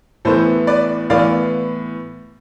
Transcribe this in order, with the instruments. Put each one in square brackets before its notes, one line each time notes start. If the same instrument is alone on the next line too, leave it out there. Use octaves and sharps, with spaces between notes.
[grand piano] A2 E3 B3 A4 C5
B4 D5
A2 E3 B3 D5 F5